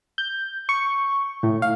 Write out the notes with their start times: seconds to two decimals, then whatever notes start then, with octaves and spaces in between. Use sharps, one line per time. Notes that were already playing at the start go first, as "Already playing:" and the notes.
0.18 G6
0.69 C#6
1.43 A2
1.62 F5